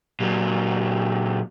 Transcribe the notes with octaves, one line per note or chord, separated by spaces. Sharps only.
A#2 F#3